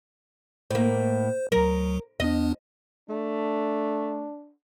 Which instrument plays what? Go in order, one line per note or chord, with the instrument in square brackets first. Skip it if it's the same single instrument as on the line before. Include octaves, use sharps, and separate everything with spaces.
[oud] A2 A#3 [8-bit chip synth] C5
[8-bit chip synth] D2 F#3 [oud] A#4
[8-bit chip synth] E2 B3 D4 [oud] D#5
[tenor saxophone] A3 [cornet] D4